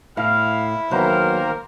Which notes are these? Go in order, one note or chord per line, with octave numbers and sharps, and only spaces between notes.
A2 E4 F5
E2 D#3 F#3 A#3 A#4 C5